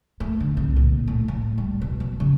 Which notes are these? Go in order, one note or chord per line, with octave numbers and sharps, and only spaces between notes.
A3
D3
C2
A#2
A2
A2
G3
B2
F#3
C#3